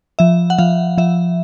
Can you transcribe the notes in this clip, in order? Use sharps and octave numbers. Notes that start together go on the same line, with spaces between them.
F3 E5
F#5
F3 F5
F3 E5